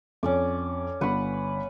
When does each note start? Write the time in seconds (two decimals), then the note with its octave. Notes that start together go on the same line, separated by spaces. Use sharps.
0.23 F2 C#4 D5 D6
1.01 G1 B4 F#5 B5